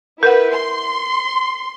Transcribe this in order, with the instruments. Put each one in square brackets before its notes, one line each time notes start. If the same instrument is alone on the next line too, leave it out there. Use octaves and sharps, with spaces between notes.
[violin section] E4 B4 [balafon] A#4 F#5
[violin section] C6